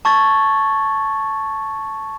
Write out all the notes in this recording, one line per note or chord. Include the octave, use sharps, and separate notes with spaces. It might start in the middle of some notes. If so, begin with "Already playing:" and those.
A5 C#6 G#6 A6